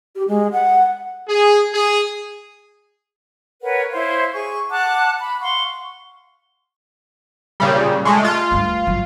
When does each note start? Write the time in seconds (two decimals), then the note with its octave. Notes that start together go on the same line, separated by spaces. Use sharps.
0.16 G4
0.28 G#3
0.53 F#5
1.29 G#4
1.73 G#4
3.62 A#4 B4 C#5 F#5
3.91 E4 C5 C#5 F5
4.33 G#4 C#6
4.69 F#5 A5 D6 F#6
5.20 B5
5.41 F5 F#5 C6 C#6
7.60 A#2 C#3 G3
8.05 G#3 A3
8.25 F4
8.51 G2 A3
8.87 A1 F#3